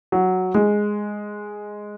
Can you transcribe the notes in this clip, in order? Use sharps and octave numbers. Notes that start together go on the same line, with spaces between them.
F#3
G#3